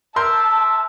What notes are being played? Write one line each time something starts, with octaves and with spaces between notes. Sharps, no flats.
A#4 E5 A5 C6 G6